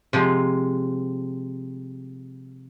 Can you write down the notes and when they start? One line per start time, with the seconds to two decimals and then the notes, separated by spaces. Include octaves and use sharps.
0.13 C3 F3 G#3